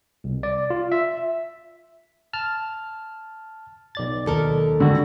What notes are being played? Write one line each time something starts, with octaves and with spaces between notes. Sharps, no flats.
C2
D5
F4
E5
A5 F6
B1 D5 A6
D#2 A4 A#4
D3 G3 F#4